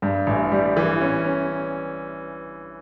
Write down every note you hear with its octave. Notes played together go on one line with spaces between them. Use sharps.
G2
A1
G3
E3
C#4
C#4